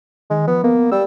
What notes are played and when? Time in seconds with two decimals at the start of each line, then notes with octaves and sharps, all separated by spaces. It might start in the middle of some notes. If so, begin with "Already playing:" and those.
0.30 D#3 G#3
0.47 F3 B3
0.64 A#3 B3
0.92 G3 E6